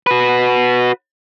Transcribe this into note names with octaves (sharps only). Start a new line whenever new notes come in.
F#4 B4